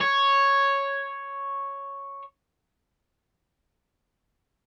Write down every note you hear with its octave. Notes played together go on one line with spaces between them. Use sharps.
C#5